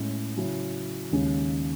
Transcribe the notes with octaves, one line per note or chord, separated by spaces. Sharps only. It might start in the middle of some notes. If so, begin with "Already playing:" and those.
Already playing: A2 G#3 C#4
C#3 F#3 C#4 E4
D#2 C#3 G#3 C#4